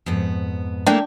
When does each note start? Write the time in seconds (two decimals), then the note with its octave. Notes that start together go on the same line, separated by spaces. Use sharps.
0.06 F2 G#2 B3
0.87 A3 A#3 D4 E4 G5